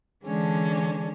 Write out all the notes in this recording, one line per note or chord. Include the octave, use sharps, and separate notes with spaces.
D3 E3 G#3 C#4 D4